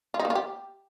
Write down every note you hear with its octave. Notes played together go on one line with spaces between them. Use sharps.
F4
D#4
A#3
F4
G4